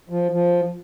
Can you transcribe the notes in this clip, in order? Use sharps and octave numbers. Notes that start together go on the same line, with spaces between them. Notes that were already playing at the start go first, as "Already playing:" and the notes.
F3
F3